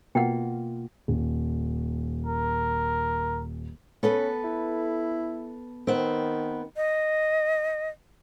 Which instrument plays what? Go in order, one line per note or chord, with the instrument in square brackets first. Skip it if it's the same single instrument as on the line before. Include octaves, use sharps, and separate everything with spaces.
[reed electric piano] B2 A#3 F4 [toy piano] F#5 G5
[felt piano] D#1
[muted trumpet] A#4
[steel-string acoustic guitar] B3 A4 B4 [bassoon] C#4
[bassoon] E4
[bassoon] D#3 [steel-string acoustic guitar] B3 C4
[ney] D#5